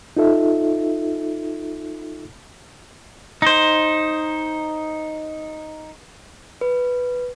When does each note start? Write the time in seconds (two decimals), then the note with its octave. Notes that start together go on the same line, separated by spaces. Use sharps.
0.17 D#4 F4 A4 E5
3.42 D#4 C5
6.61 B4